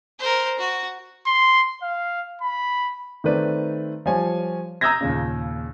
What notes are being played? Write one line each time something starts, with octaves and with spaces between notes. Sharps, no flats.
A#4 C5
F#4
C6
F5
B5
D#3 A3 C4 B4 D5
F3 G3 C#5 G#5
A#5 D#6 E6 G6 G#6 A#6
D#2 A#2 C#3